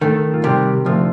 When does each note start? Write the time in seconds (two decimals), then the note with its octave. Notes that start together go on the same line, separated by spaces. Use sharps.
0.01 D#3 A3 A4
0.34 F4
0.44 C3 G3 G4
0.86 D2 F3 F4